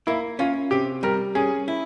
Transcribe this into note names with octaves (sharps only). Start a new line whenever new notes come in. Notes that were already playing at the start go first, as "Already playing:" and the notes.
A#3 E4
C#4 F4
C3 G4
G3 A#4
C#4 G#4
E4